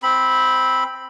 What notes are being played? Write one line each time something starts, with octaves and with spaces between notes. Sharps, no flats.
C4 B5